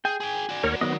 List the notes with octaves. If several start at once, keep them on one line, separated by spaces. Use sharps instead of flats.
G#4 G5 G#5
G#4 G5 G#5
F#4 D5
D#2 A#4 C#5
D#3 F#3 B3 D#5